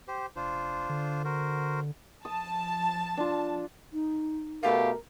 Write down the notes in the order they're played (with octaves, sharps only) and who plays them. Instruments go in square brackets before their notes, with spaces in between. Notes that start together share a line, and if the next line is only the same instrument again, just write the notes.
[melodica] G4 C5
[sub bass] F1 [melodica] D4 F4 C5
[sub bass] D3
[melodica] F#4 A#4 C5
[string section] F3 A5 [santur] D#6
[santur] D4 F4
[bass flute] D#4
[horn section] B2 A3 G4 [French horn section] A#4 [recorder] F5